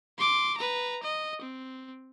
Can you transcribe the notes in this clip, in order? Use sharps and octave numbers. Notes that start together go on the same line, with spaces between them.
C6 D6
B4 A#5
D#5
C4